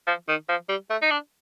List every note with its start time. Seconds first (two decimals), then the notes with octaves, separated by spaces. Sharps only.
0.07 F3
0.28 D#3
0.49 F3
0.69 G3
0.90 A3
1.02 D#4
1.11 D4